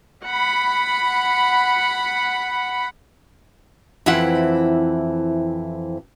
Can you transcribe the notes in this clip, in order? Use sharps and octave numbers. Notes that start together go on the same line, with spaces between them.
F#5 B5
F2 E3 C4 E4 C5 F#5